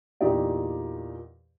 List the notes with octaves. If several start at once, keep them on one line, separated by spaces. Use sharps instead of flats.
E2 A#2 D#4 G4 D5